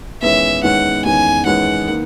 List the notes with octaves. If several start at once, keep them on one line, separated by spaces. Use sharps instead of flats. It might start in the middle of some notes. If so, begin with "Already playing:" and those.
E2 D#3 G#3 C#4 E5
E2 D#3 G#3 C#4 F#5
E2 D#3 G#3 C#4 G#5
E2 D#3 G#3 C#4 F#5
D#3 A#3